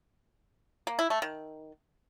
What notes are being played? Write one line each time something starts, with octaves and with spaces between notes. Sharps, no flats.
A#3
E4
A3
D#3